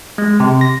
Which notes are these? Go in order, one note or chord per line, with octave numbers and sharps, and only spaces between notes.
G#3
C3
A#6